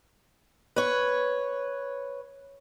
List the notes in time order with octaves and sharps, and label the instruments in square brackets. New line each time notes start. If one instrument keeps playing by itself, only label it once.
[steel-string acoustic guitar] B4 C#5